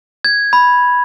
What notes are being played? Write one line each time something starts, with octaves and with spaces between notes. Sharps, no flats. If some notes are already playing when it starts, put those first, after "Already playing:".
G#6
B5